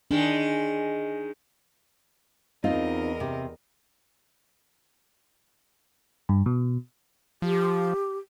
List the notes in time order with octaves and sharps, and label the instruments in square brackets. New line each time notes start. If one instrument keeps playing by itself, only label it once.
[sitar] D#3 G#3 [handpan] D4
[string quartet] E2 A#4 D#5 [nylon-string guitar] C4 D#4 F4
[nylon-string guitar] C3
[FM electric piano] G2
B2
[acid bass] F3 [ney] G4